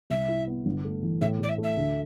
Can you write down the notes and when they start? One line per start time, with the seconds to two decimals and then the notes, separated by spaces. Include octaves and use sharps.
0.10 C2 E5
0.28 E4
0.47 B3
0.66 G1
0.84 A3
1.03 E3
1.21 A2 E5
1.40 A2 D5
1.49 E5
1.58 A3
1.63 E5
1.77 D2